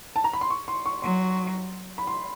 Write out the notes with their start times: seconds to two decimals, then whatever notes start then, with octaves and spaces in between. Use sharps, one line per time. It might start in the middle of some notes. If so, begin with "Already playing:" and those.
0.16 A5
0.24 A#5
0.33 B5
0.41 C6
0.50 C#6
0.68 C6
0.86 C#6
1.02 F#3 C6
1.98 B5
2.07 C6